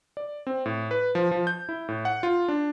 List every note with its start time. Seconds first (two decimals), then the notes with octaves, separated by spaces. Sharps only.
0.17 D5
0.47 C4
0.66 A2
0.91 B4
1.15 F3
1.31 F3
1.47 G6
1.69 E4
1.88 A2
2.05 F#5
2.23 F4
2.48 D4